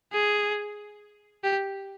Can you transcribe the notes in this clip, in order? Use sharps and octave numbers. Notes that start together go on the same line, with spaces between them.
G#4
G4